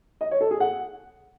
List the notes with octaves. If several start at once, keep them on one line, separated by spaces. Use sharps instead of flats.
D#5
C#5
A4
G#4
F#5